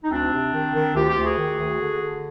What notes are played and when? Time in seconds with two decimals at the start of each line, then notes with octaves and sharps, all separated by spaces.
0.03 D#4
0.10 D2 C4 D4
0.32 C3
0.53 D#3
0.74 D#3
0.95 D2 F4 G4
1.09 F4 G4
1.16 D2
1.23 F#4 G#4
1.37 D#3
1.58 D2
1.79 D3
2.01 D3